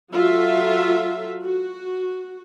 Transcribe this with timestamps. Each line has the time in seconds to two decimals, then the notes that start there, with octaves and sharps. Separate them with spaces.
0.13 F#3 F4 F#4 A4 E5
1.43 F#4